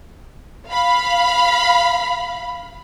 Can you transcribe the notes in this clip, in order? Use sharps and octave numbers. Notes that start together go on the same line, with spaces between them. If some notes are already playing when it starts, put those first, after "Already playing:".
F5 B5